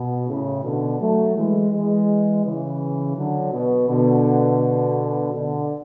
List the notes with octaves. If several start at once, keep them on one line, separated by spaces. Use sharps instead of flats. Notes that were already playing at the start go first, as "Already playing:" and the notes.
Already playing: B2
A2 C#3
B2 D3
F#3 A3
E3 G#3
E3 G#3
C#3 E3
D3 F#3
B2
B2 D3
B2 D3